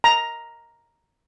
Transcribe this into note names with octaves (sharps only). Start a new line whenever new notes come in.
A#5